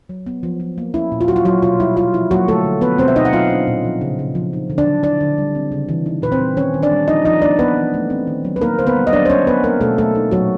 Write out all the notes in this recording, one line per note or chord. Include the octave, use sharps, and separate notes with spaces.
F#3
B3
F3
F3
A#3
C#4 E4
A#2
F4
F#3 F#4
F4
F#3 E4 F#4
B2 F4
G3 E4
E4 F4
F3 E4
F#3 A#3 F#4
D3 A3 A4
D3
F3 B3 B4
B2 C4 C5
E5
B2 D#4 D#5
F#5
F#3 F4 F5
D4
A#2
F3
C#3
C#3
F3
D#4
D3
D4 D5
F#3
D4 E4 D5
D3
G3
C4
C#3
E3
D#4
A#2 B4
C4 C5
G3
D#3 C#4 C#5
D#3
D4 D5
G3
F3 D#4 D#5
F3 D#4 D#5
A#3 D4 D5
B3 E4 B4
E3
A3
C4
D#3
F#3
B4
A#3 D#4 A#4
D3 C5
B3 B4
G3
D#5
F#3 D4 D5
C5
F#3 C#4 C#5
B3 B4
A#3 D4 A#4
B2 A3 A4
F#3 A3 A4
D#4
A#2 F#3 F#4